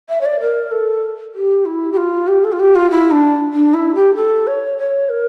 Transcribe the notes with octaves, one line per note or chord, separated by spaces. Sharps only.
E5
C#5
D5
A#4
A4
G4
E4
G4
F4
G4
A4
F4
G4
F4
E4
D4
D4
E4
G4
A4
C#5
C#5
A#4